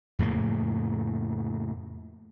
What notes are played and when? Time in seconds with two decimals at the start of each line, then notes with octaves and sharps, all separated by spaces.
0.19 F2 A2 C#3 A#3